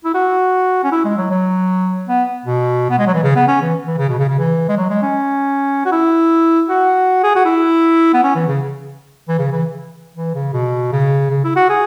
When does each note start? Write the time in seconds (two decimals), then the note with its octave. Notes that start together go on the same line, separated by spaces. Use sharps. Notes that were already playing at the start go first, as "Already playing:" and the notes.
0.04 E4
0.14 F#4
0.84 C#4
0.92 E4
1.05 G#3
1.17 F#3
1.30 F#3
2.07 B3
2.45 B2
2.90 B3
2.99 G#3
3.07 F#3
3.14 E3
3.23 C#3
3.35 B3
3.48 C#4
3.62 E3
3.87 E3
3.98 C#3
4.09 B2
4.19 C#3
4.29 C#3
4.38 E3
4.69 G#3
4.77 F#3
4.89 G#3
5.02 C#4
5.85 F#4
5.92 E4
6.69 F#4
7.23 G#4
7.35 F#4
7.45 E4
8.14 B3
8.23 C#4
8.35 E3
8.48 C#3
9.28 E3
9.39 C#3
9.52 E3
10.15 E3
10.34 C#3
10.53 B2
10.92 C#3
11.30 C#3
11.44 E4
11.56 F#4
11.69 G#4